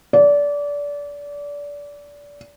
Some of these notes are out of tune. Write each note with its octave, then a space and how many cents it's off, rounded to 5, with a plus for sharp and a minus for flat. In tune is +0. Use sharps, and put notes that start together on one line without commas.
D5 -25